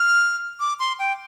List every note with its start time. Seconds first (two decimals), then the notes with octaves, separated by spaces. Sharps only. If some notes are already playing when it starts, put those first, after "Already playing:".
Already playing: F6
0.60 D6
0.79 C6
0.99 G5